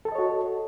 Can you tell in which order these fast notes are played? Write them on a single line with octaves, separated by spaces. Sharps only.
A4 A5 D#5 C#5 F#4